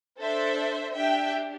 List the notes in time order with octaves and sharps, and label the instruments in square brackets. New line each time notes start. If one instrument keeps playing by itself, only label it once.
[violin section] D4 A4 C5 E5
D4 G4 E5 G5